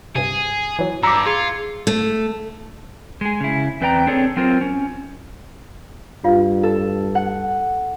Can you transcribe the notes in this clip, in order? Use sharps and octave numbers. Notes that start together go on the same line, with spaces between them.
G2 C3 G#4
E3 F#3
G2 A#5 D6 E6
F4 G#4 G#6 C#7
A3
G#3 G#4
C#3 E4
E2 C4 B4 D5 G5 A#5
C4 D4 G#4 A4 C#5
F#3 C4 F4 A#4 C5
C#4
G2 F4 D5 F5
A4
F#5